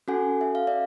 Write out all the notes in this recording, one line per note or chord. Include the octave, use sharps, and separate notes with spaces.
C#4 F#4 A4 F#5 G#5
E5
F5
D5 E5